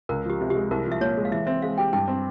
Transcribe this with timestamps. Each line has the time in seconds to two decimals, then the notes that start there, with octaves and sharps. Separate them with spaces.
0.09 C#2 A#4
0.25 F3 G4
0.41 C3
0.50 G4
0.55 G#3
0.71 C2 A#4
0.85 F3
0.92 E5
1.01 A#2 C#5
1.17 G#3
1.25 F5
1.31 E3 E5
1.47 C4 E5
1.62 G#3 F5
1.78 G4 G5
1.93 G2 G5
2.08 C4